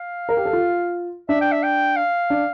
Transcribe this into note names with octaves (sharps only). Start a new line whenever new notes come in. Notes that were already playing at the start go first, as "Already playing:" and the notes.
Already playing: F5
A#4
G4
A4
F4
D4 E5
G5
E5
G5
F5
D4